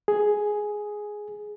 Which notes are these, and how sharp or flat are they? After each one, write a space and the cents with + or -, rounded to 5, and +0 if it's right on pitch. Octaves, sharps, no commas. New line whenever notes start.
G#4 +5